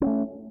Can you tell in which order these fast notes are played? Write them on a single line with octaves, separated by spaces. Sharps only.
C#4 B3 A3